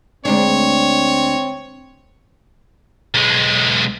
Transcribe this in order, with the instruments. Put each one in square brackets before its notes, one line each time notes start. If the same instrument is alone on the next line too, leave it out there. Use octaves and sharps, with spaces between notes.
[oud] D2 G#3 D4 [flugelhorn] C4 [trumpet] C#5
[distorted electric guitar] B1 G#3